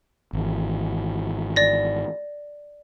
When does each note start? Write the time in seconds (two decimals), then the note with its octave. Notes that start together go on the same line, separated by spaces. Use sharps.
0.33 G#1 E3
1.56 D5 A#6